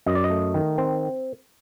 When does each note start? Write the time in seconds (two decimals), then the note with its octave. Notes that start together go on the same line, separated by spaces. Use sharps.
0.06 F#2 D#5
0.15 D5
0.24 D#5
0.30 A3
0.54 D#3
0.78 C4